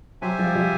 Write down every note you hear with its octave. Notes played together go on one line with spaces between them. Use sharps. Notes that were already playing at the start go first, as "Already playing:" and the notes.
F#3 G4 C5 E5 G#5
F3 G3
F3 G3